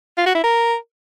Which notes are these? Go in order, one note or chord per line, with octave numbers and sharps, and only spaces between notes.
F4
F#4
E4
A#4